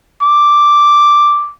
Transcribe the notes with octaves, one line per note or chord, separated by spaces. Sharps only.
D6